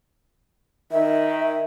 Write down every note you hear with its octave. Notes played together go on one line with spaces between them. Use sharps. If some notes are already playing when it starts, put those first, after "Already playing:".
D#3 E5